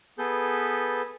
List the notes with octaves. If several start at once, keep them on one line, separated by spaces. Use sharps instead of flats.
B3 G#4 A4 B4 G6